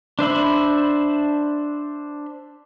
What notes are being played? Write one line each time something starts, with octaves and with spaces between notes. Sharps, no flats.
D4 C5 E5 B5